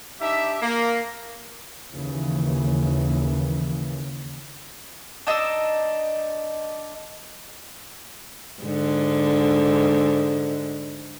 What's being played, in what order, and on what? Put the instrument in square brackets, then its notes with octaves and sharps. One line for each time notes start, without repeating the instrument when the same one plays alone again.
[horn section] D4 D#4 G4 E5
A#3
[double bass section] D#2 C#3 E3
[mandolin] D4 D#4 D#5 E6
[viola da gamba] G#2 D3